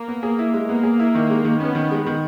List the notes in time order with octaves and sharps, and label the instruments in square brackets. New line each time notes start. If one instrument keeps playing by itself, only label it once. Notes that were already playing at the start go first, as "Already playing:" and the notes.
Already playing: [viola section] A#3
[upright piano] B3
G#4
E4
G#3
[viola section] A#3 [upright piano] B3
[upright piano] G#4
E4
D#3
G#3
D#3
[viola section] B3 [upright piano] C#4
[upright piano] D#3
G#3
D#3